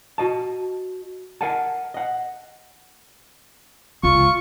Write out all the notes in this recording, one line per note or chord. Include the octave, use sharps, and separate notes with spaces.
F#4 D#5 A5
A#4 D#5 F#5 G#5 A5
D#5 F#5
C#2 G#3 F4 C#6